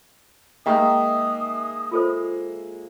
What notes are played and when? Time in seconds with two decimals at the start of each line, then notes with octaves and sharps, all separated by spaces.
0.66 D#3 G#3 A#3 E5 D#6
1.92 F4 A4 C5